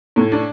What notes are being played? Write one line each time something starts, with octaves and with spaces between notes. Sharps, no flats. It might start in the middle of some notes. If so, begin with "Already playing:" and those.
A2
D4